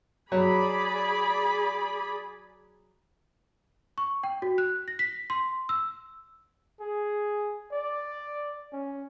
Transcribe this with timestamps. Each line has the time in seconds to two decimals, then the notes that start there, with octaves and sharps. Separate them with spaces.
0.32 F#3 G#4 D5 B5
3.98 C#6
4.24 G5
4.42 F#4
4.58 F#6
4.88 A#6
4.99 B6
5.30 C6
5.69 E6
6.80 G#4
7.72 D5
8.73 C#4